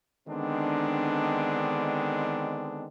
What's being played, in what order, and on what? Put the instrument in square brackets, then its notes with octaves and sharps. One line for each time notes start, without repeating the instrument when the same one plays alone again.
[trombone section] D3 D#3 G#3 B3 C4 D4